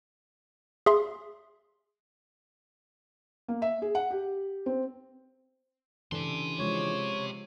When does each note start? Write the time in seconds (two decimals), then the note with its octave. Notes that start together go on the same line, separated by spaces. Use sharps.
0.86 G#4 E5 C6
3.48 A#3
3.62 E5
3.82 G#4
3.95 F#5
4.11 G4
4.66 C4
6.12 C#3 E3 D4 G4 A4 C6
6.59 F3 G#3 C#5